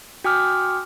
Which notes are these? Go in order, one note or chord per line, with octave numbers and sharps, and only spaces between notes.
F#4 G5 G#5 D6 D#6 F6